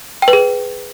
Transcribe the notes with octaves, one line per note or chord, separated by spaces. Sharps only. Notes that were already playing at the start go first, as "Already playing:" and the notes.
G5
B4
G#4